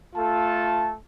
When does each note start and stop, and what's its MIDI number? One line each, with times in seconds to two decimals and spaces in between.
0.16 0.94 57
0.16 0.94 65
0.16 0.94 69
0.16 0.94 81